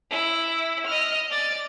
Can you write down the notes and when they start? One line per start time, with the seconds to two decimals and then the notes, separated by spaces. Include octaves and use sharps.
0.11 E4
0.87 D#5 F6
1.31 D5 A6